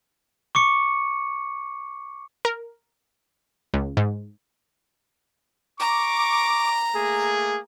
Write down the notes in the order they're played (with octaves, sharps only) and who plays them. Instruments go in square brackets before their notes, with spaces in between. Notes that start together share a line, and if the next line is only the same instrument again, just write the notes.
[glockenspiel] C#6 D6 C#7
[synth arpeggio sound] A#4
C#2
G#2
[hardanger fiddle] A#5 [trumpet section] C#6 D6
[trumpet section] A3 A#3 G#4